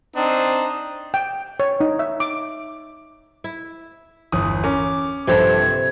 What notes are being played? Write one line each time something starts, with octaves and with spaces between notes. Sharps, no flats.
C4 D4 D#4
G5
C#5
D#4
E5
D6
E4
G1 E2 D#6
C#4 A#4 D6
A#1 G2 C3 C4 A4 G#6